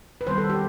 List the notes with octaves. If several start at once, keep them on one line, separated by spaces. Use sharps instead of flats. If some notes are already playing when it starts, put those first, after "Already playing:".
B4
D#3 G3 B3 C5
A4
G4